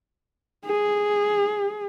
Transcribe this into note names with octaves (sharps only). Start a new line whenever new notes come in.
G#4